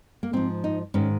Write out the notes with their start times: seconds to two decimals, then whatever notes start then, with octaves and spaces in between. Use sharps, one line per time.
0.23 A#3
0.33 G#2 F3 C4
0.64 D#4
0.94 G#2 D#3 C#4